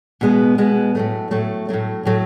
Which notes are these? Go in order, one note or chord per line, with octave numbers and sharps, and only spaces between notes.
B2 G#3 B3
B2 G#3 B3
A2 F#3 A3
A2 F#3 A3
A2 F#3 A3
A2 F#3 A3